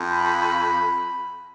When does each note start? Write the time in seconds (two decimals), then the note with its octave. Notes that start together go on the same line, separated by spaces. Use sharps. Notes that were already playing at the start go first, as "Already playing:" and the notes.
Already playing: F2
0.10 B5